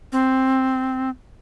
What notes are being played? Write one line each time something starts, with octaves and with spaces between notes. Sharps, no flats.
C4